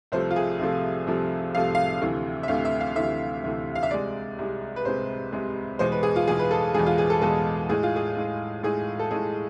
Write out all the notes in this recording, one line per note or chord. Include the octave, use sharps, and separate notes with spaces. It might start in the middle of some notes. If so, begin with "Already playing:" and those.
C2 C3 F3 A3 C5
F4
G#4
C2 C3 F3 A3
C2 C3 F3 A3
C2 C3 F3 A3 F5
F5
D2 C3 E3 A3
E5
D2 C3 E3 A3 F5
E5
F5
D2 C3 E3 A3 E5
D2 C3 E3 A3
F5
E5
C2 C3 G#3 D5
C2 C3 G#3
B4
C2 C3 G#3 C5
C2 C3 G#3
E2 B2 G#3 C5
B4
G#4
F4
E2 B2 G#3 G#4
B4
A4
E2 B2 G#3 G#4
F4
G#4
A4
E2 B2 G#3 A4
A2 G#3 G#4
F4
G#4
A2 G#3
A2 G#3 G#4
A4
A2 G#3 G#4